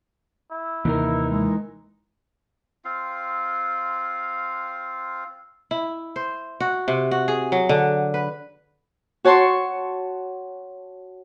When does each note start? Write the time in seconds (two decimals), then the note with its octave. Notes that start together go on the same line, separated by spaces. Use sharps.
0.51 E4
0.85 D#2 C3 E3 A#3 D#4 A#4
1.30 G#3
2.85 C4 F4 F5
5.71 E4
6.16 C5
6.60 F#4
6.88 C3
7.11 F#4
7.28 G#4
7.52 F#3
7.69 D3
8.14 B4
9.25 F#4 C#5 A5 C6 C#6